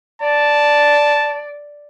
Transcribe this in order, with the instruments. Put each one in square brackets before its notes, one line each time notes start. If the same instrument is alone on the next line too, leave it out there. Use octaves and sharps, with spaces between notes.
[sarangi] D5 [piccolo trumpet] A5